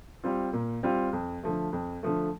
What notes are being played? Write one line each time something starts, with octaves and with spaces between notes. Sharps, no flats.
G3 C4 F4
A#2
G3 C4 F4
F2
D3 F3 A3
F2
D3 F3 A3